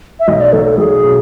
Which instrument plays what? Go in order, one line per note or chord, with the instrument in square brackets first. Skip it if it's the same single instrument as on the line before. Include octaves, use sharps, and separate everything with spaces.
[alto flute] E5
[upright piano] B1 [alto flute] D#5
[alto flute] D5
[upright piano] F#3 [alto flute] A4
[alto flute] A4
[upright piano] B1 [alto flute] G#4
[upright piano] B2